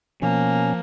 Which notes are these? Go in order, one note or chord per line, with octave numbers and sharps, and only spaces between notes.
B2 F3 A#3 C#4 G#5